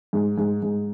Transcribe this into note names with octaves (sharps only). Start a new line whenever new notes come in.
G#2
G#2
G#2